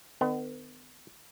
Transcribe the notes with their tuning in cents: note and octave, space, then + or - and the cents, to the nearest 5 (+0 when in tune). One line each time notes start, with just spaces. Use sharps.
D#3 -35 B3 +40